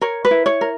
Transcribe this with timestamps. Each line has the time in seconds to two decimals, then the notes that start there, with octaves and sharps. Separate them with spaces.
0.01 A#4 C#5
0.25 B4
0.31 E4
0.46 C#5
0.61 A#4